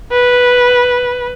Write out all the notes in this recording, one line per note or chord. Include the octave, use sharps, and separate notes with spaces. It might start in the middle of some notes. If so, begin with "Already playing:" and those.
B4